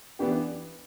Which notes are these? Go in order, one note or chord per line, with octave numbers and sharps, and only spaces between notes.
E3 B3 D4 G4